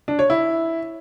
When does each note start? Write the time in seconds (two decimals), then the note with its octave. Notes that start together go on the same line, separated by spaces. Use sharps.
0.08 D4
0.19 C#5
0.30 E4